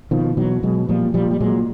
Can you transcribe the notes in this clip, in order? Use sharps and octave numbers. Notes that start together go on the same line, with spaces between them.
B2 D#3 F3
B2 E3 F#3
B2 F#3 G#3
A#2 F3 G3
A#2 F3 G3
G3
A#2 F#3 G#3